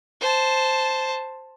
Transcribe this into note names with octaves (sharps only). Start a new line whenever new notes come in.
C5 A5